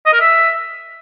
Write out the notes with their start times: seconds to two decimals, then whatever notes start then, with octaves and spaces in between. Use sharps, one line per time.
0.06 D#5
0.13 A#4
0.21 E5